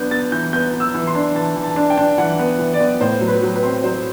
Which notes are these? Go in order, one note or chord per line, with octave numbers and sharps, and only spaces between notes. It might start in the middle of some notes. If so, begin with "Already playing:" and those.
Already playing: B3 D4 G6
B3 A6
E3 G6
B3 G6
B3
E6
E3
C6
D4
E3 A5
E3
A5
D4
G5
D4
E3 F#5
B3
E3
D5
B3
A2 C5
F#3
B4
F#3
B4
C4
F#3 C5